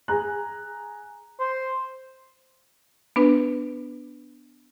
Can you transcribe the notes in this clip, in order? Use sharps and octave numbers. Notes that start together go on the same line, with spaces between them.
G#4 G#5 A#5 F#6
C5
B3 D4 B4